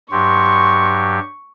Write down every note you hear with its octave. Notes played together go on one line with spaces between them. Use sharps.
G2 F#3 G4 C6 C#6